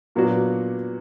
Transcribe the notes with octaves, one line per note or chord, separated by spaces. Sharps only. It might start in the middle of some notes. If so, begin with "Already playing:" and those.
A#2 F#3 B3 D4 F#4